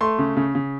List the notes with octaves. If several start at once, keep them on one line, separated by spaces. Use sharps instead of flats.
A3 C6
C#3
C#3
C#3